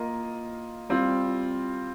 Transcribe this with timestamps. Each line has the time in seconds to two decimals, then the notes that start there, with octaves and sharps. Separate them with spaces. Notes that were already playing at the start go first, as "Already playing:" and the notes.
Already playing: A#3 F4 A#4 D#5
0.89 G3 C4 F4